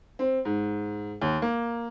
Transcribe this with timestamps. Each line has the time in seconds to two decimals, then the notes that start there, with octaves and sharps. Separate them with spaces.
0.19 C4
0.45 G#2
1.22 D#2
1.42 A#3